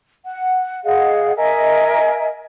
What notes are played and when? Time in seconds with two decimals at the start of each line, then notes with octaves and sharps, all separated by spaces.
0.25 F#5
0.84 G#4 D#5 F5 F#5
1.36 A#4 D#5 E5 G#5